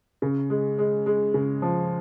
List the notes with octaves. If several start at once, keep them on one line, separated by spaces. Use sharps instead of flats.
C#3
G#3
G#3
G#3
C#3
F3